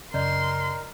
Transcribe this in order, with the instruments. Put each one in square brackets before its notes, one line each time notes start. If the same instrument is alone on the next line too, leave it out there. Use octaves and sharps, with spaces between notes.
[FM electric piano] F#2 C#3 [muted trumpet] A#4 [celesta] D5 D#5 G6 [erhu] C6